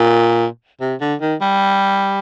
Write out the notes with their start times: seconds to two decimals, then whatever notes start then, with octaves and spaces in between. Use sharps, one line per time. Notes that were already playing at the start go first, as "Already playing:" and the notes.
Already playing: A#2
0.81 C3
1.01 D3
1.21 D#3
1.41 G3